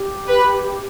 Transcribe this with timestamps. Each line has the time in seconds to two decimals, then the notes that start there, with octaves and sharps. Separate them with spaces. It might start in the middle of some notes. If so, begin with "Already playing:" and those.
Already playing: G4
0.29 B4